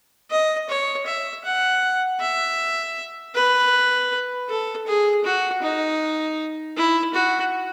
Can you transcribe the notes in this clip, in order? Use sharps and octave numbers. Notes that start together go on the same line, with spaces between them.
D#5
C#5
E5
F#5
E5
B4
A4
G#4
F#4
D#4
E4
F#4